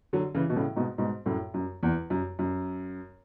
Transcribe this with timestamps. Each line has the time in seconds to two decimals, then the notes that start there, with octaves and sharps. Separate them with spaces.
0.13 D3 F#3
0.35 C#3 E3
0.50 B2
0.56 A2 C#3
0.76 G#2 B2
0.98 G#2 B2
1.26 F#2 A2
1.54 F#2
1.83 E2
2.10 F#2
2.39 F#2